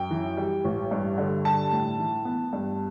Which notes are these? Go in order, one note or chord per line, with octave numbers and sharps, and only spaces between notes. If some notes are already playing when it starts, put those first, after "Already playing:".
Already playing: F#2 G5
E3
G3
A1
G2
D3
G3 A5
A2
E3
B3
G2